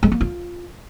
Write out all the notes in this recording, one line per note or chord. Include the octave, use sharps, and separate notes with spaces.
G#3
A#3
F4